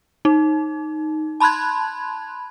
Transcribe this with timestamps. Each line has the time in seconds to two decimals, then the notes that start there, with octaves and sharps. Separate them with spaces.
0.25 D#4
1.40 A5 B5 C6 F#6 G#6